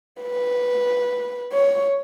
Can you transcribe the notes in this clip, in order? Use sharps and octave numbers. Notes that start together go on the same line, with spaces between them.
B4
C#5